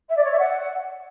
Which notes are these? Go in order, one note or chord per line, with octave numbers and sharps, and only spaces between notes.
E5
D5
C#5
E5
F#5